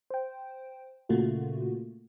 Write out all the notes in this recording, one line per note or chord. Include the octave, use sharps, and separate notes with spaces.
C5 G5
A#2 C#3 A3 A#3 F4 F#4